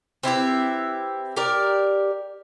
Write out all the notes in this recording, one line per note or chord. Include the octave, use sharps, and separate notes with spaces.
C4 E4 G4 B4
G4 A#4 D5